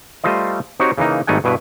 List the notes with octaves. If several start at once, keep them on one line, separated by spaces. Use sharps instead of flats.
G3 A3 F4 C5 D#5
C4 D#4 F#4 G4 C#5
C#3 E3 A#3 D#4
G#1 G3 A3 D#4 F#5 G#5
G2 B2 E4 B4